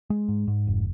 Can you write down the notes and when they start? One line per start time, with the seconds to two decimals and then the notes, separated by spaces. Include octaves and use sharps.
0.10 G#3
0.28 G#2
0.47 G#2
0.67 F1